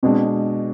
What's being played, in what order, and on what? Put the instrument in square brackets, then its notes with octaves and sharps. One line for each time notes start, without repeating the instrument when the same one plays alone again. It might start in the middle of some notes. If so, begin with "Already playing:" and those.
[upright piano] B2 G#3 D4 [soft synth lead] C4